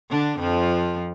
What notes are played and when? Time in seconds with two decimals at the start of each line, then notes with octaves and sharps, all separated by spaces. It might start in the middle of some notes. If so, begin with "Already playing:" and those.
0.10 D3 D4
0.38 F2 F3